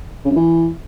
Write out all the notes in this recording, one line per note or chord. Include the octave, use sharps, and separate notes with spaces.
C#3
F#2
E3